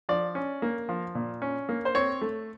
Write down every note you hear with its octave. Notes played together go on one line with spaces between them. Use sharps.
F3 D5
C#4
A#3
F3
A#2
C#4
A#3
C5
C4 C#5
A3